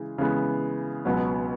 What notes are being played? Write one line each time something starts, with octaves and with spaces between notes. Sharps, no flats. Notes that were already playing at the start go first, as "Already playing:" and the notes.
Already playing: C#3 E3 G#3
C#3 E3 G#3 B3
C#2 B2 F#3 B3